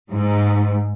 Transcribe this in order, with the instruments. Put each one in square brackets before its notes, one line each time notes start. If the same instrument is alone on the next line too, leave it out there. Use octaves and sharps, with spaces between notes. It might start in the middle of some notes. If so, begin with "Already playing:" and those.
[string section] G#2